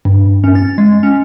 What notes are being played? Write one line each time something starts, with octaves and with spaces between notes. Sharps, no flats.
G2
C#4
A6
G#3
C#4